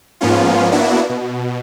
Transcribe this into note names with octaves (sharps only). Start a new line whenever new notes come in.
G#2 F3 A#3 B3 C#4 F4
A#3 B3 D4 E4 F#4
B2